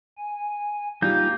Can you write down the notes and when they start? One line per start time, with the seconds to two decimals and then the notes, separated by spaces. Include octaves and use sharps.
0.17 G#5
1.02 G3 A#3 D#4 F4 G4 G6